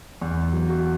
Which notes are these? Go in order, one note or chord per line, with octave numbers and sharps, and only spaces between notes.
E2
F#3
F#4